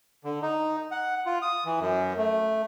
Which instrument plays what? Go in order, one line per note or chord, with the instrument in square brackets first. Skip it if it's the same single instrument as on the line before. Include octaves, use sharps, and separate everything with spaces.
[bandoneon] D3
D#4
F#5
F4
D#6
E3
F#2
A3